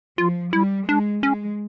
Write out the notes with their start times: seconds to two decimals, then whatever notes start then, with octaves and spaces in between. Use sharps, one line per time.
0.18 F3 F4
0.53 G3 E4
0.88 G#3 D4
1.23 G#3 C#4